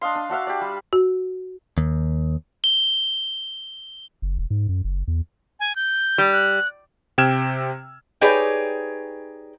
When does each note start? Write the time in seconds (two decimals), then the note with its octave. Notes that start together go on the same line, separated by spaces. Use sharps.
0.01 D4 D#5 F5 C6
0.15 D4
0.29 D4 F#4 E5 F5
0.47 G4 D5
0.61 G3
0.93 F#4
1.78 D#2
2.64 G7
4.22 F#1
4.38 E1
4.50 G#2
4.69 F#2
4.84 F#1
5.08 E2
5.60 G#5
5.76 G6
6.18 G3
6.33 F#6
7.18 C3 G5 E6 F6 G#6 E7
8.21 D#4 G4 G#4 B4 C#5 D5